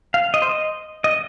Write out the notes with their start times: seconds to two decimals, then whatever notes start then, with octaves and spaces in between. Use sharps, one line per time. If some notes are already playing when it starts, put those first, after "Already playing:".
0.14 F5
0.34 D#5
0.42 C5
0.49 D#5
1.04 D#5